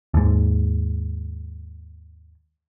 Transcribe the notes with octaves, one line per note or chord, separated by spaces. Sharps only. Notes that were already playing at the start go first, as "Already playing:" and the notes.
D#2 G#2